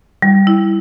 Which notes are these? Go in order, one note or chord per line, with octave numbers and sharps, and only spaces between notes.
G3
E4